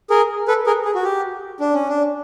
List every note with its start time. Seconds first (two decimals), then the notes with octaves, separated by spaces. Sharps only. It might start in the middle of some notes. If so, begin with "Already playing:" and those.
0.10 G#4 A#4
0.48 A4 B4
0.66 G#4 A#4
0.85 G#4
0.95 F#4
1.04 G4
1.60 D4
1.74 C#4
1.89 D4